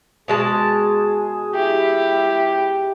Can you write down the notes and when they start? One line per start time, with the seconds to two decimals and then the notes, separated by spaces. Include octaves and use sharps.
0.28 B2 G#3 G#4 A5
1.55 E4 G4